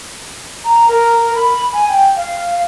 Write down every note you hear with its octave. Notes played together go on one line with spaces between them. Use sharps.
A#5
A#4
B5
G#5
G5
F5